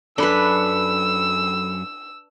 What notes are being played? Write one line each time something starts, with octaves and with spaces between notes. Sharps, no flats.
F#2 D4 A4 B4 B5 E6